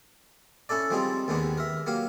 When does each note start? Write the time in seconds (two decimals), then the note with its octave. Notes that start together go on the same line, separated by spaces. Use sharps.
0.69 C#4 E4 A4 D5
0.91 F3 G3 G#3 C4 D#4
1.28 D#2 D#3 G#3 B3 D4
1.58 A#4 E5
1.86 F#3 A#3 G4 F5